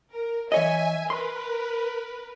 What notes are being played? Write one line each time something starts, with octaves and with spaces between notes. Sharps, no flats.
A#4
E3 C#5 D#5 E5 G#5
A#4 B4 C6